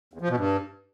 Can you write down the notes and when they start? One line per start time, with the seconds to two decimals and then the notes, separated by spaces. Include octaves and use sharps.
0.13 E2
0.21 F3
0.29 B2
0.37 G2